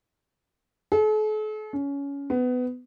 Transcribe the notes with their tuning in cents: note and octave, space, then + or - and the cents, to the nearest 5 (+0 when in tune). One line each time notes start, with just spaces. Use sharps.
A4 -45
C#4 +20
B3 +20